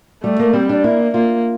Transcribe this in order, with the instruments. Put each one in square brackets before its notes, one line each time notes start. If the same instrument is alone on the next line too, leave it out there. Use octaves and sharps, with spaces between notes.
[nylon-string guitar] G3 [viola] A3
[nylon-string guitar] A#3
[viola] G3 [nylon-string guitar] C4
[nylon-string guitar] D4
[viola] A#3 [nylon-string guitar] E4
[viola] A#3 [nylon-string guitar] F4